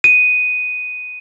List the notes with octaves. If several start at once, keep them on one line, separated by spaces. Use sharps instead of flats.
D#7